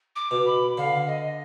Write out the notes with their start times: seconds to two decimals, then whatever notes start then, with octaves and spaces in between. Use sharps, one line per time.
0.16 D6
0.31 B2
0.46 B5
0.77 D3 F5
1.07 D#5